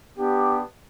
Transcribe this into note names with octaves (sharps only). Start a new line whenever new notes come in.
B3 D4 G4